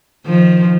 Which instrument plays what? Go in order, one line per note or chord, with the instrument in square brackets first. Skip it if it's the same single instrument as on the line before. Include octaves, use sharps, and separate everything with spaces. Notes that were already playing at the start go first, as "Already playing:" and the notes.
[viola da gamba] D#3 F3